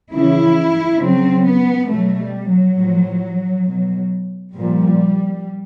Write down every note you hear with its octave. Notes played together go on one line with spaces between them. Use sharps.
C#3 E3 E4
C#3 F#3 C4
B3
B2 F#3 A3
G3
F#3
A2 F3
B2 F#3
A#2 F3 G3